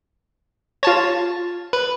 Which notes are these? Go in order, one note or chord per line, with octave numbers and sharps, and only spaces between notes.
F4 C#5 A5 A6
B4